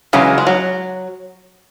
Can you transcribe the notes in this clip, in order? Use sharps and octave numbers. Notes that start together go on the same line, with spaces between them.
C#3 E3 F#3 G#3
G#3
F#3